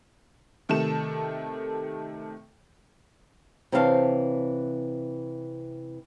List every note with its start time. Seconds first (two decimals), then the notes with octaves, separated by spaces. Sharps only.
0.69 C3 D#3 A3 A4 E7
3.72 C3 E3 C5 C#5 F5 A5